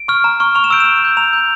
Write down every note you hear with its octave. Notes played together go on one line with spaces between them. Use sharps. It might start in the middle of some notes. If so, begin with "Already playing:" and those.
Already playing: D7
C#6 F6
A#5
C#6 F6
C#6 F7
E7
E6 G6 D7
E7
C#6
E6 G6
A#5 F7
E6 G6